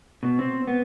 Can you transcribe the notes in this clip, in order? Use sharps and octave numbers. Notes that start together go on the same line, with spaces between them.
B2
C4
B3